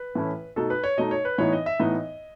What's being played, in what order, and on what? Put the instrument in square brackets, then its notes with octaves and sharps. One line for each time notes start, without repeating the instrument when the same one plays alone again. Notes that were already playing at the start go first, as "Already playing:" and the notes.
Already playing: [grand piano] B4
A2 E3 A3 C#4 E4
B2 A3 D#4 A4
B4
C#5
B2 A3 D#4 D#5
C#5
B4
A2 E3 B3 D#4 C#5
D#5
E5
A2 E3 B3 D#4 D#5